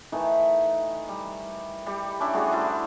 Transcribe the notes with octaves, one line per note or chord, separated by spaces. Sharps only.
D#3 E3 A3 D#4
G3
G3 G4
C#4 D4 E4 G4
G3 A3 F#4 G#4
E4 C5 D5